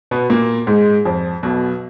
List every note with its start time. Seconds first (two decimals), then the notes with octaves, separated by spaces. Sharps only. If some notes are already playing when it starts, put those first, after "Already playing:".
0.11 B2 B3
0.30 A#2 A#3
0.67 G#2 G#3
1.05 F2 F3
1.43 B1 B2